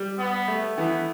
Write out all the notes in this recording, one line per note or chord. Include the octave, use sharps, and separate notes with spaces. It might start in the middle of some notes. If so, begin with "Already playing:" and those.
Already playing: G3
B3
A3
E3 B3